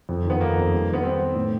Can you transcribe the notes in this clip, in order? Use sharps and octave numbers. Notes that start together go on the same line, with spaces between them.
F2
D#3 B3
F2 A#3
F2
G3
D#3 B3
G3 C4
G3
A2